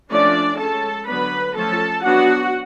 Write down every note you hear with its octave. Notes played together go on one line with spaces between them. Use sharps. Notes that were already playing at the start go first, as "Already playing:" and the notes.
F3 A3 C#4 D4 D5
G#3 C#4 A4 A5
D3 F#3 B3 D4 B4 B5
F3 A3 C#4 A4 A5
F#3 B3 D4 F#4 F#5